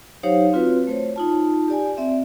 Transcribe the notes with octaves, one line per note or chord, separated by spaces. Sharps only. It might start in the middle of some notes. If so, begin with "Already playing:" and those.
F#3 D#4 G4 C5 C#5 F5
C4 F4 F#4 B4
A3 C5 C#5
D#4 F4 A5
G4 D5 G#5
C4 D5 E5